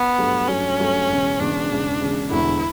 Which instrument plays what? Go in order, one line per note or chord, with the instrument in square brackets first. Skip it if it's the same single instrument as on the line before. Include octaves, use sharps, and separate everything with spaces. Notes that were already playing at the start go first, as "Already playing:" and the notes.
Already playing: [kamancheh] B3
[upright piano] G2 F#3 A3
[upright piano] G2 F#3 A3 [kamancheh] C#4
[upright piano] G2 F#3 A3
E1 E2 C#3
[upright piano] E1 E2 C#3 [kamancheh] D4
[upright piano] E1 E2 C#3
E1 E2 C#3
[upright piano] E1 E2 D3 A3 [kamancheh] E4